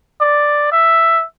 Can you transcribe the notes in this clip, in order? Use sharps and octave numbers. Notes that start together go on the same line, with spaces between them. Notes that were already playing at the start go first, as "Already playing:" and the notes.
D5
E5